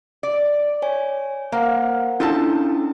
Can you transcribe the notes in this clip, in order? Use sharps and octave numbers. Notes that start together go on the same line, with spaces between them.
D5
C#5 G#5
A#3 A#4 C5 F#5
C#4 D4 E4 F4 A4 A5